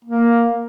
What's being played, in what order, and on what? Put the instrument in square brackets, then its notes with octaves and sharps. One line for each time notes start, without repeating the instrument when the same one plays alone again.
[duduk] A#3